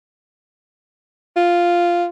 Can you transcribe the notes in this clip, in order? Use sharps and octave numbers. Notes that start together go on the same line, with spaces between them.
F4